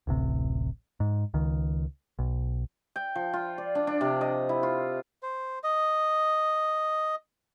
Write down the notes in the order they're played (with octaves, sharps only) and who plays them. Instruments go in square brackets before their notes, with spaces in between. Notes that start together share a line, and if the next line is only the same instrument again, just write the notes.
[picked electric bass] D1 A1 C3
G#2
C#2 D#3
B1
[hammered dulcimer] G5
F3
F4
D5
D4
D4
C3
D#5
E4
F4
[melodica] C5
D#5